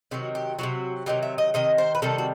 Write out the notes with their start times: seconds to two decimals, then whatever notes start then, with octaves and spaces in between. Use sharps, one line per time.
0.11 C3 D#3 F#3 F#4
0.35 G4
0.59 C3 D#3 F#3 F#4
1.06 C3 D#3 F#3 G4
1.23 E5
1.38 D#5
1.54 C3 D#3 D#5
1.78 C5
1.95 B4
2.02 C3 D#3 G3 A4
2.18 F#4